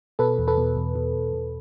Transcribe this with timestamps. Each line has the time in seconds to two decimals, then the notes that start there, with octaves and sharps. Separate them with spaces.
0.19 B2 A4 B4
0.39 E2
0.48 A4 B4
0.58 B2
0.76 E2
0.96 B2
1.15 E2
1.33 B2